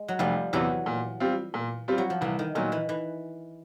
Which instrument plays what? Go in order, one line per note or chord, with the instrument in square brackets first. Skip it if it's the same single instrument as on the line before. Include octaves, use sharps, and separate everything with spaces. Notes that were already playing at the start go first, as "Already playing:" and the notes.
Already playing: [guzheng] G#3
F#3
[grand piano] F1 [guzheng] F3 G3
[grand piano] E2 C3 [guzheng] E3 F#3
[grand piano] A#2
G3 C4 F4
A#2
G3 C4 F4
[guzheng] F#3
F3
[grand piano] C2 [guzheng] E3
[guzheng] D#3
[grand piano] A#2 F#3 [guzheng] D#3
[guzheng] E3
E3